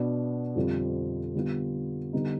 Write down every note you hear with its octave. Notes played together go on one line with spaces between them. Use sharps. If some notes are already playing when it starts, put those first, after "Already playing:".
Already playing: B2 B3 D4
F2 D3 G3 C4 F4
D3 G3 B3 F4
D3 G3 B3 D#4